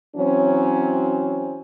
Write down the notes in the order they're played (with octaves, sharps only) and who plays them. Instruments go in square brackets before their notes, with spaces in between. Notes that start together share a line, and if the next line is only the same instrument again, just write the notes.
[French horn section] E3 F#3 C4 C#4